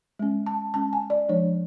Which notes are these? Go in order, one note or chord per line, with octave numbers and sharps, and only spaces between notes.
G#3 C#4
A5
G#3 C#4 A5
G#5
D5
F3 G#3 D4 C#5